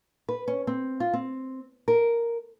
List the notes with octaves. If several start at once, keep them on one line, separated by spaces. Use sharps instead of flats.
B4
C#4
C4
F4
C4
A#4